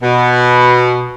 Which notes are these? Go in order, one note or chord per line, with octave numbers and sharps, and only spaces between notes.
B2